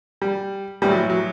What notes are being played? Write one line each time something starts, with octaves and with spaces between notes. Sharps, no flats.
G3
A1 A2 E3 G3
F#3
F#3